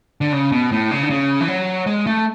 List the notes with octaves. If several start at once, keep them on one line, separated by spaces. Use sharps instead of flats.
D3
C#3
B2
A2
C#3
D3
C#3
E3
F#3
G#3
A3